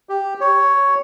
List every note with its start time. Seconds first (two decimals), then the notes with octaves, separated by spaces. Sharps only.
0.09 G4
0.41 C#5